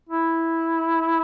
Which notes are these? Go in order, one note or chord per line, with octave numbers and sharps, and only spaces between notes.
E4